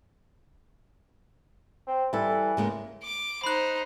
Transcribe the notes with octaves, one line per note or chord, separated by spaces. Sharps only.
C4
E3 G3 A4
C#3 G#3 A#3
D6
D#4 C5 B5 F#6